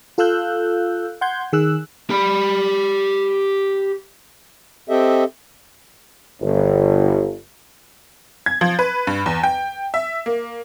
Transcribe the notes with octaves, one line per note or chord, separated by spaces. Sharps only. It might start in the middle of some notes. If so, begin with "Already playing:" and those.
F4 A4 F5 E6 F#6 G6
F#5 C6 G6 G#6
D#3 G#4 E6 F#6
G4 B5
C4 G4 A4 D#5 E5
G1
G#6
F3
B4
G2
E2
G5
E5
A#3